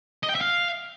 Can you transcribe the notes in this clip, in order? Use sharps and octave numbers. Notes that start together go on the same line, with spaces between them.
D#5
G5
E5
F5